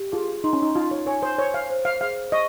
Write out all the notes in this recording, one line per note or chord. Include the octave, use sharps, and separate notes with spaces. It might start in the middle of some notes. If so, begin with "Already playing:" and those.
Already playing: G4
F4 G#4
D#4 C6
C#4
D#4
D#4 F4
C#5
C#5 G#5
C5
C5 C#5
F5
C5
F5
G#4 F5
D#5 C#6